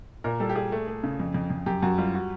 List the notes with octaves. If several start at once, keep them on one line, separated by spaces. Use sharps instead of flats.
A#2 A#4
G3 A4
G4
A#2 G#4
A3
A3
C#3
F2
F2
F2
F#2 G4
F#2 F#4
G3 F4
F#4